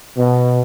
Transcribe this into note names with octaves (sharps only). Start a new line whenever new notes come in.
B2